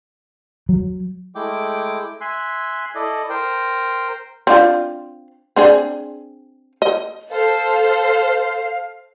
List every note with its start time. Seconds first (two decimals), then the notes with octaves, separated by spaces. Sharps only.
0.69 F#3
1.35 G#3 A3 E4 G5 D6
2.21 E5 G#5 C6 F#6
2.95 E4 A4 D5 D#5
3.30 A#4 C5 G5
4.47 C4 D4 F4
5.56 C4 D4 G#4
6.82 D#5
7.31 A4 C5 F5